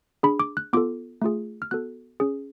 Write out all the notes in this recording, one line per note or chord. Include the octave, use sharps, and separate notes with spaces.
D4 G#4 B5
D6
F#6
B3 F4 A4 D6
A3 F4 G#4
F6
B3 F#4 A4 F#6
C#4 G#4